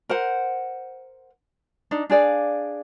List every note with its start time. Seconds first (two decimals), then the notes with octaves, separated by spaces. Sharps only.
0.09 A#4 C5 F#5
1.91 D4 D#4
2.10 D4 G#4 D5 F5